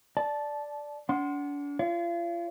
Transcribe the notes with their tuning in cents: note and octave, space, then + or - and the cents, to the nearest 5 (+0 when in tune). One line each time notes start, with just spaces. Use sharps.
D5 +0 A5 -15
D4 -40 F#5 +10 C6 +0
F4 -35 C#5 +40